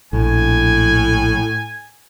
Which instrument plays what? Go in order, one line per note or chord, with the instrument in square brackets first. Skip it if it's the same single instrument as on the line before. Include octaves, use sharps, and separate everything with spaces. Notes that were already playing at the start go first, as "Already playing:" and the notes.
[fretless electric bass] A#1 [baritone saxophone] A2 [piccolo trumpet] G#5